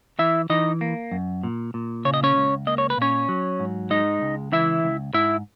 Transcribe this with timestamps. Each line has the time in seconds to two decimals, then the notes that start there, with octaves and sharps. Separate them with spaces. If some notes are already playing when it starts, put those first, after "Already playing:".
0.19 E3 E4 E5
0.50 E3 D#4 D#5
0.81 A#3
1.12 F#2
1.43 A#2
1.74 A#2
2.05 C#3 C#5
2.14 D#5
2.23 C#4 C#5
2.36 C#2
2.67 A#3 D#5
2.78 C#5
2.90 B4
2.98 A#2 C#4 C#5
3.29 F#3
3.60 G#2
3.90 G#3 D#4 D#5
4.22 C#2
4.52 E3 E4 E5
4.84 C#2
5.14 G#2 E4 E5